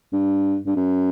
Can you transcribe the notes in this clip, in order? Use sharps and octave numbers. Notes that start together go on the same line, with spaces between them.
G2
G2
F#2